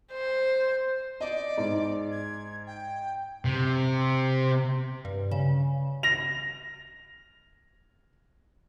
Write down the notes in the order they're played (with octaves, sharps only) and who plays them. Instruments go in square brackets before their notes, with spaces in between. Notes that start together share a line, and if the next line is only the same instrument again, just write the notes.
[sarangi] C5
[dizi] D5 [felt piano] D#5
[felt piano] G#2
[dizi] G#6
G5
[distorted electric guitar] C3
[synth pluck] G2
C#3
[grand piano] A#6 F7